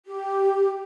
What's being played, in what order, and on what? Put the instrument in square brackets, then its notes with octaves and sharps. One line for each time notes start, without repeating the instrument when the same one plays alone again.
[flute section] G4